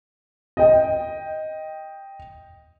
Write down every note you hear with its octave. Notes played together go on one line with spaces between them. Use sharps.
D#5 G5